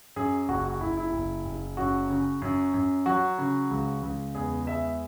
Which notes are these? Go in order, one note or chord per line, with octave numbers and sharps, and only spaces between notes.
F#2 G#4
F#1 F#4
F#4
F#1 E4
E4
F#1
F#1
F#2 F#4
C#3
F#2
F#2
F#3 F#4
C#3
C#2
C#2
E2 G#4
G#3 E5